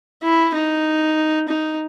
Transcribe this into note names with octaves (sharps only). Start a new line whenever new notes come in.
E4
D#4
D#4